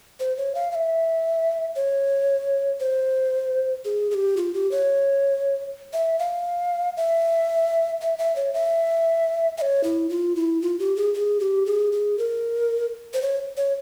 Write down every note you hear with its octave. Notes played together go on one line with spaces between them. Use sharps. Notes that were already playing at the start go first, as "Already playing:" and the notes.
C5
C#5
F5
F5
E5
C#5
C5
G#4
G#4
G4
F4
G4
C#5
E5
F5
E5
E5
E5
C#5
E5
E5
C#5
E4
F4
E4
F4
G4
G#4
G#4
G4
G#4
G#4
A#4
C5
C#5
C#5